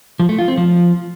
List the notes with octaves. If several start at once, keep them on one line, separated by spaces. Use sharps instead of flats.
F3
A3
F4
C4
F3